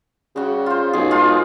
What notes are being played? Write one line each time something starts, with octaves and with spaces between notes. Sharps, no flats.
C#3 G3 F#4
F4 C5
B1 G#4
G#3 D#4 F4